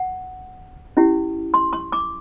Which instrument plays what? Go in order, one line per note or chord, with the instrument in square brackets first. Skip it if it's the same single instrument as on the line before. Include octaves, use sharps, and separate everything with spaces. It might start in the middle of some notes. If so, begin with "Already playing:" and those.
Already playing: [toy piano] F#5
C#4 E4 G4
C6
C#6
D6